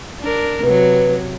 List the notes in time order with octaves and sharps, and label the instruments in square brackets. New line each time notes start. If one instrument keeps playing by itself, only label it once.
[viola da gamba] D4 A#4
[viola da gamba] C3 F#3 [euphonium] B4